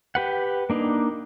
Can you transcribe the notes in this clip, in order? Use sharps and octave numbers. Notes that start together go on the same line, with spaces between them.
G4 B4 F#5
A#3 D4 D#4